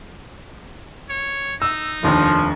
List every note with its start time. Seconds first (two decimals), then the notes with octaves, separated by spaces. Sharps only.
1.09 C#5
1.62 D#4 E6
2.03 F1 D#2 F3 D4